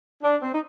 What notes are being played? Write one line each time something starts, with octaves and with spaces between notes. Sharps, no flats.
D4
C4
D#4